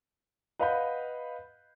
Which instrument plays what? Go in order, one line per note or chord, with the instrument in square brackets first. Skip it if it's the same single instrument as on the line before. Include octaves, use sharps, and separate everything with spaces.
[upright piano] B4 D#5 F5 F#5 B5 G6